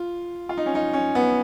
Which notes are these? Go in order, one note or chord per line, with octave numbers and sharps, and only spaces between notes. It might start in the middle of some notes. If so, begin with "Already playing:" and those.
Already playing: F4
F4
D#4
C#4
D#4
C#4
B3